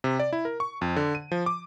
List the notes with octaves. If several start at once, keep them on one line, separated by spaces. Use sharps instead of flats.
C3
D5
E4
A#4
C#6
F2
D3
D#7
F3
D6